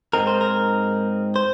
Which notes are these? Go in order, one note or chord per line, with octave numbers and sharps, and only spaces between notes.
G#2 G#3 C4 D#4 A#4
C5
A#4
C5